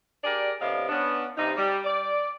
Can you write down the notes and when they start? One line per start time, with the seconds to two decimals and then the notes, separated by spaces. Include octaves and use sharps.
0.24 D4 G4 G#4 A#4 D5
0.61 A2 C3 B3 D4 D#5 F5
0.89 B3 C#4 D4
1.37 G2 C3 G3 D#4
1.56 G3
1.84 D5